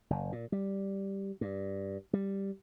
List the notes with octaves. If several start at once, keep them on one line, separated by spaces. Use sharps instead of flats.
F#1
A#2
G3
G2
G3